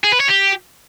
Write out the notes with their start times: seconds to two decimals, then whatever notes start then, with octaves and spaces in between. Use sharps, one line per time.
0.04 G#4
0.12 B4
0.20 C#5
0.28 G4